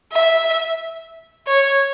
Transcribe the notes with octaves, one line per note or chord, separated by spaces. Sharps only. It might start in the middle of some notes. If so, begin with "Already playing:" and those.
E5
C#5